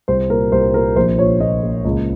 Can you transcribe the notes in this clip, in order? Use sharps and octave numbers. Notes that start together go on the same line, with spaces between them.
C2 C5
A#2 A#4
C2 C5
A#2 A#4
A#1 C5
A#2 C#5
A#2 D#5
A#3
C#2